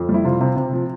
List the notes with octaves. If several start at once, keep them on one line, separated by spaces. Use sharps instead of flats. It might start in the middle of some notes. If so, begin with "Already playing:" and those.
Already playing: F2
G3
E4
C3 F4
C3
C3
F3